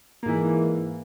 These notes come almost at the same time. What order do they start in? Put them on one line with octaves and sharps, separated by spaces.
A#3 G#2 E3